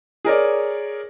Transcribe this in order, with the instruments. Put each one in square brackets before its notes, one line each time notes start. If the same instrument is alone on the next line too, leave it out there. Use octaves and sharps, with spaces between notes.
[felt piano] G#4 A#4 C#5 D5